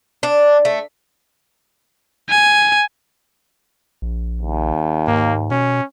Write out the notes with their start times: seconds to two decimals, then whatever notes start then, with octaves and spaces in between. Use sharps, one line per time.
0.23 D4
0.65 A3
2.30 G#5
4.02 A#1
4.42 D#2
5.08 G#2 A#3
5.51 B2 C#4